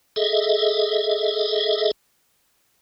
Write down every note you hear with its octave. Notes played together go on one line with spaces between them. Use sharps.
G#4 A4 D#5 E5